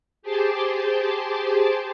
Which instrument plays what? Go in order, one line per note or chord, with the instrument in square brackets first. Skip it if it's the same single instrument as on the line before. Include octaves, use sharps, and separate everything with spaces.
[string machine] G4 G#4 C5 A5 C6 D6